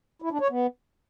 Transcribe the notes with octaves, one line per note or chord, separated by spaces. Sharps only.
E4
D4
C#5
B3